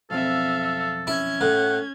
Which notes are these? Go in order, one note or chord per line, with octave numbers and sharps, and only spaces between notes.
B1 F2 C4 A4 E5 F5
C#4 E4 G#6
A2 F#5